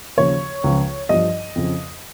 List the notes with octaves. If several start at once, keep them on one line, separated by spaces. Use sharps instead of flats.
D#2 C#3 F3 C#5
C#2 C#3 F3
G2 F3 D#5
F2 C#3 F3